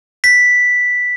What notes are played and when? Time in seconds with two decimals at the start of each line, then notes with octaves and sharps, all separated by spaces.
0.24 B6